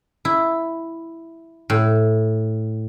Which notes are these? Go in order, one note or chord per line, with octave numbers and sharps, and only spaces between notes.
E4
A2